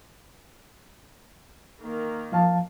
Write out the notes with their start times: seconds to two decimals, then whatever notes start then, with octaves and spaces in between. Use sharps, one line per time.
1.80 D#3 A#3
2.32 F3 F5 A5